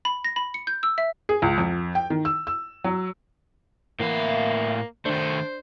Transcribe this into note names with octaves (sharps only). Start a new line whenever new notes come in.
B5
A#6
B5
C#7
G6
E6
E5
G#4
C#2
F2
G5
D#3
E6
E6
F#3
A2 E3 A#3 B3 F5
D#3 A3 D4 C5